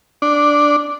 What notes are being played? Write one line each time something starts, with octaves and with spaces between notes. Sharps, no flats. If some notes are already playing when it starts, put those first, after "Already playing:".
D4